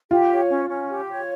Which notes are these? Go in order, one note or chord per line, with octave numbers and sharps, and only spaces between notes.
F4 G4
C#5
C#4
C#4
G4
C#5